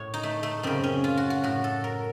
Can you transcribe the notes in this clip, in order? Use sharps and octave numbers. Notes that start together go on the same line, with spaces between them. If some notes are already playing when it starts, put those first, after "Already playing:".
Already playing: A2 C#5
D#4
A3
A3
F#2 C#3 C4
C#4
F4
F#4
F#4
A2 F#4
A4
A#4